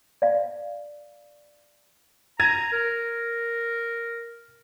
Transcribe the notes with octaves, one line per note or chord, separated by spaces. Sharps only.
D5 F5
A#5 G#6 A#6 D#7
A#4